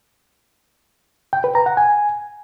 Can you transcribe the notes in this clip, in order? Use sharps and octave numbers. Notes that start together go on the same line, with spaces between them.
G5
B4
A#5
F#5
G#5